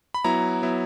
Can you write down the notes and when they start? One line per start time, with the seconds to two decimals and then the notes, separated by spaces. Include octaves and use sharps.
0.14 B5
0.24 F#3 B3 E4 A#5
0.62 F#3 B3 E4